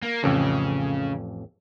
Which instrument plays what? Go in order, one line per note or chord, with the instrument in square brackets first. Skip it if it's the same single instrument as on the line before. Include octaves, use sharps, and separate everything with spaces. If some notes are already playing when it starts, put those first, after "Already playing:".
[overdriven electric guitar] A#3
[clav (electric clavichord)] A1 F2 [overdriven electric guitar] C#3